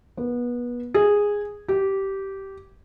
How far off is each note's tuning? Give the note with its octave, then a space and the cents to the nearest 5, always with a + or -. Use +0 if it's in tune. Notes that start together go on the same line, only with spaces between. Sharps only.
B3 -25
G#4 -10
G4 -15